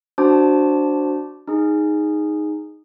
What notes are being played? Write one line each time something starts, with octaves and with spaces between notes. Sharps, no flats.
D4 F#4 C5 A5 D6
D#4 G#4